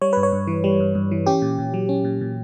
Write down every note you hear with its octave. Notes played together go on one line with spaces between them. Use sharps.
G3 C#5
G2 B4
C#5
G2
E3
G3
G2
G2
E3
C#4 G4
A#2
A#2
F#3
C#4
A#2
A#2